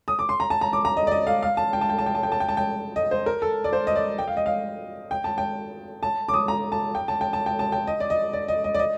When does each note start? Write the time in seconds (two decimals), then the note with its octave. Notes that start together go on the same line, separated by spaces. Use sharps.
0.08 D#6
0.19 D6
0.29 C6
0.40 A#5
0.50 A5
0.61 A#5
0.73 D6
0.85 A#5
0.97 D#5
1.07 D5
1.11 D#5
1.27 F5
1.43 F5
1.57 A5
1.73 G5
1.81 A5
1.89 G5
1.98 A5
2.06 G5
2.15 A5
2.23 G5
2.32 A5
2.40 G5
2.49 A5
2.57 G5
2.96 D#5
3.11 C5
3.26 A#4
3.42 A4
3.64 D5
3.73 C5
3.87 D#5
3.96 D5
4.18 G5
4.28 F5
4.37 D#5
4.46 F5
5.11 G5
5.24 A5
5.38 G5
6.03 A5
6.28 D6
6.34 D#6
6.48 A#5
6.72 A5
6.95 G5
7.08 A5
7.21 G5
7.33 A5
7.46 G5
7.59 A5
7.72 G5
7.87 D#5
8.00 D5
8.10 D#5
8.33 D5
8.48 D#5
8.64 D#5
8.74 D5
8.79 D#5